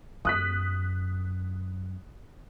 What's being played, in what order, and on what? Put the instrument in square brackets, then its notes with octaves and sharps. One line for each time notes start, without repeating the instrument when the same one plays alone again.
[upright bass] F#2 [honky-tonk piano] D#6 F#6 B6